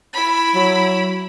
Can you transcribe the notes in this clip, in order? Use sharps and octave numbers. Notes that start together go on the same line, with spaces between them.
E4 B5
F#3